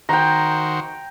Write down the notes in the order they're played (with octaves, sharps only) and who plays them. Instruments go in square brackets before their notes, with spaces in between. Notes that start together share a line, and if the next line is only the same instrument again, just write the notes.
[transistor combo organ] D#3 F#4 C5 [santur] G5 A#5